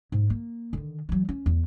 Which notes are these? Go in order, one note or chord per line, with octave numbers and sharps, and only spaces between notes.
G#2
A#3
D3 D#3
E3 F#3
C#4
E2